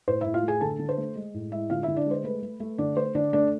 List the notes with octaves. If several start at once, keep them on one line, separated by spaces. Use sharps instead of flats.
A2 C5
A2 E4 E5
F4 F5
A3
G#4 G#5
D3 A4 A5
D3
C5
A3
G#3
A2
G#3 E4 E5
D3 F4 F5
D3 E4 E5
D4 D5
G#3 C5
A3 B4
A3
A3
D3 D4 D5
A3 C5
D3 D4 D5
A3 D4 D5